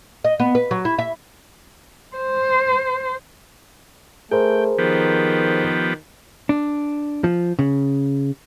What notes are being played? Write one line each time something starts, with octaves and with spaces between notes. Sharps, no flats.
D#5
B3
B4
F#3
E4
E5
C5
A3 G#4 A#4 C5 G5
D#3 F3 B3 G4
D4
F3
C#3